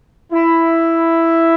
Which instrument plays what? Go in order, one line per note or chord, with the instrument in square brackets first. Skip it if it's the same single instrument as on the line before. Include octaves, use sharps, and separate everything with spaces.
[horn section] E4